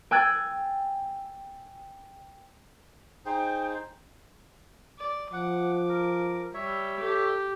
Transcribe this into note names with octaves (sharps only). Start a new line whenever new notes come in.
G5 G#5 E6 F#6 G#6 A6
D#4 G#4 C5 G5
D5
F3 F#5 D6
A#4
G3 C#5 E5
G4 A4